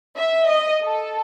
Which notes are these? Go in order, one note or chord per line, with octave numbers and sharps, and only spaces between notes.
E5
D#5
A4